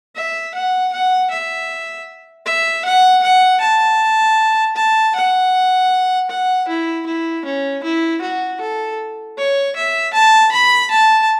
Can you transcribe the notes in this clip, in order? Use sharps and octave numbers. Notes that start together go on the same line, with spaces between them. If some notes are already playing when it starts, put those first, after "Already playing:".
E5
F#5
F#5
E5
E5
F#5
F#5
A5
A5
F#5
F#5
E4
E4
C#4
E4
F#4
A4
C#5
E5
A5
B5
A5